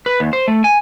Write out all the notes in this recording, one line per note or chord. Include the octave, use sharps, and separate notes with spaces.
B4
D#2
C5
A3
G#5